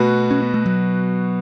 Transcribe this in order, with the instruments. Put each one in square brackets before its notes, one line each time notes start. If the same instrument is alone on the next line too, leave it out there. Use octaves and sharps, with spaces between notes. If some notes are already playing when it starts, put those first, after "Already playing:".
Already playing: [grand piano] B2 B3 F#4 [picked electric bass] A3
[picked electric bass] C#4
B3
A3
F#3